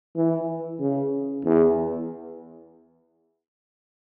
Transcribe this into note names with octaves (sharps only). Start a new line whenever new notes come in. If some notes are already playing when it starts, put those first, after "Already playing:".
E3
C#3
E2